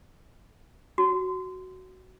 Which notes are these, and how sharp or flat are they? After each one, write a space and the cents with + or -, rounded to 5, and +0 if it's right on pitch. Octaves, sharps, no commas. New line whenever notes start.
F#4 +10